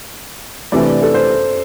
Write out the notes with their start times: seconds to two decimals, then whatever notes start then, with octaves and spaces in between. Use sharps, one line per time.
0.72 C3 E3 A3 D4 D5
1.02 A4
1.14 C5